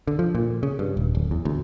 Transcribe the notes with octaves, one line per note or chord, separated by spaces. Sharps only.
D3
F3
A#2
C#3
G2
D#1
D1
E2
D2